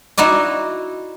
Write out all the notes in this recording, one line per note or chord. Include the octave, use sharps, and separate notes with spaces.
D#4 E4 F#4 D5